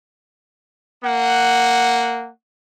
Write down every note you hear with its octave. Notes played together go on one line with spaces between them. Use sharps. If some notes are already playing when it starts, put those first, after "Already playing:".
A#3 F#5